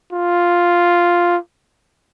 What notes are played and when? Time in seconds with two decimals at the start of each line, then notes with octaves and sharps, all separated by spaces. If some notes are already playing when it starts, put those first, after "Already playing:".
0.13 F4